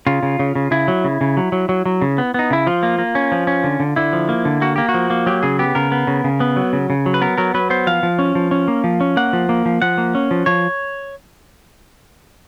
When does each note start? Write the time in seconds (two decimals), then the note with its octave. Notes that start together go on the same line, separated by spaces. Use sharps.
0.07 C#3 F4
0.23 C#3
0.39 C#3
0.55 C#3
0.71 C#3 E4
0.88 F#3
1.04 C#3
1.21 C#3
1.37 F#3
1.52 F#3
1.69 F#3
1.86 F#3
2.02 C#3
2.18 B3
2.34 B3 D#4
2.50 C#3 E4
2.67 F3 F4
2.83 A#3
2.98 A#3
3.15 C#4
3.32 F3
3.47 C#4
3.64 D3
3.80 D3
3.96 D3 E4
4.13 F3
4.29 A#3
4.45 D3
4.62 A#3 F#4
4.76 A#3 G4
4.89 F#4
4.94 F3
5.10 A#3
5.26 F#3 G4
5.43 C#3 G#4
5.59 B3 G4
5.75 C#3 A#4
5.92 B3
6.07 C#3
6.24 C#3
6.40 B3
6.56 F#3
6.73 C#3
6.90 C#3
7.06 F#3
7.14 B4
7.21 B3 A#4
7.38 F#3 A#4
7.54 F#3 B4
7.70 B3 C5
7.87 F3 F5
8.03 F3
8.19 C#4
8.35 F3
8.51 C#4
8.68 A#3
8.84 F3
9.01 C#4
9.17 A#3 F#5
9.33 F3
9.49 A#3
9.65 F3
9.82 F3 F#5
9.98 A#3
10.15 C#4
10.31 F3
10.46 F3 C#5